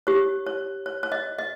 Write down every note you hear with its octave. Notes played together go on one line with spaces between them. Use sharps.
G4 C#5
C#5
C#5
C#5
D#5
D#5